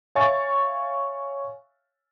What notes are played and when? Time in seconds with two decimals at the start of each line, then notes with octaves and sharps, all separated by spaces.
0.15 C#5 E5 F5 G#5 C#6 A6